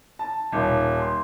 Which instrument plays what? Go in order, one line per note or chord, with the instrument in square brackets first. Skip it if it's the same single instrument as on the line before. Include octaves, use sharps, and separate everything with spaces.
[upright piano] A5
D#1
C6